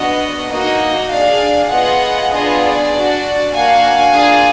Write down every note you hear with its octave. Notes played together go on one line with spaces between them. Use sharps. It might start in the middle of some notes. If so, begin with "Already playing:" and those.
Already playing: B3 D4 F#4 D#5
A#3 D#4 F#4 D#5
D4 G#4 D5 F5
B3 F4 G#4 D#5 F#5
B3 D4 F4 G#4 D#5
D5
D4 F#4
A#3 D4 F#4 F5 G#5
A#3 D4 F4 G#4